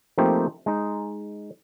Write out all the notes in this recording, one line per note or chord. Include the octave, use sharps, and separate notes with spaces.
F3 A3 A#3 C4 D#4 G4
G#3 D#4